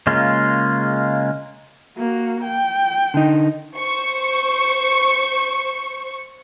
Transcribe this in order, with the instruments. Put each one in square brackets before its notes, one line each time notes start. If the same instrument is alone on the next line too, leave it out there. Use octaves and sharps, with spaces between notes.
[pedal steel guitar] C#3 G#3 A#3 F4
[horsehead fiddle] A#3 F#4
G5
[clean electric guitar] D3 D#4
[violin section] C5 C#6